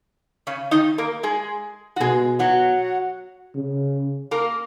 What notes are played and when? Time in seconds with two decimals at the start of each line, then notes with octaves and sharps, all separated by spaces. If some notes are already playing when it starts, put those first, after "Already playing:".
0.47 C#3 C#4
0.71 D#3 D#4
0.98 A#3 A#4
1.23 G#3 G#4
1.96 F#4
2.00 B2 G#3 G#4
2.39 F#3 F#4
3.55 C#3
4.31 A#3 A#4